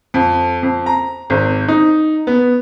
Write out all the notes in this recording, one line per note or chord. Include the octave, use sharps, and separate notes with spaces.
F2
F2
A#5
G#1
D#4
B3